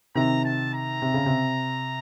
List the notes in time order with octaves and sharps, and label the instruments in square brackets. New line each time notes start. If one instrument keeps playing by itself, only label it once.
[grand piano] C3 D#3 [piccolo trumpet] A#5
[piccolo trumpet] A5
A#5
[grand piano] C3
C#3
C3